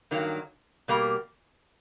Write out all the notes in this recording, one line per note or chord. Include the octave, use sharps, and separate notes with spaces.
G2 D#3 F#3 A#3
B2 G3 A#3